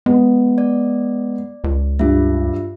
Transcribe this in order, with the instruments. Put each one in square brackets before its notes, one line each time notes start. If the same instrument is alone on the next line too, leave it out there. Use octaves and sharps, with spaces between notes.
[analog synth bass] G#3 [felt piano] B3
[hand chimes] D5
[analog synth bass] C#2
[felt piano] G2 [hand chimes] F4 E5